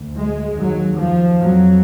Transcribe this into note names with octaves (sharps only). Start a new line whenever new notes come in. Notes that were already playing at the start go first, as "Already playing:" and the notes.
Already playing: D2
G#3
D#2 F#3
F3
F2 F#3